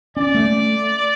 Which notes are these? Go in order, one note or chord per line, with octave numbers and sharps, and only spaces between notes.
C#4 D5
A3